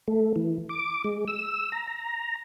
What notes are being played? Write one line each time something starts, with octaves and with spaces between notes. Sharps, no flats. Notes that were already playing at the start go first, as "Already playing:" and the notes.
A3
E3
D6
G#3
E6
A#5
A#5